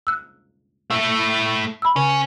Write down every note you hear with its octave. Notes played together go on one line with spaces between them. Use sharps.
E6 F#6
A3 E4
B5 E6
C#3 C#4